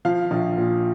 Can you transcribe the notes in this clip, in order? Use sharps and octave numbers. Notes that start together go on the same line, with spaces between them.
F3 F5
A#1
A#2